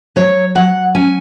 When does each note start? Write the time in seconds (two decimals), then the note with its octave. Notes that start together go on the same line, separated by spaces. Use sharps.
0.16 F#3 C#5
0.55 F#3 F#5
0.95 C#4 G#5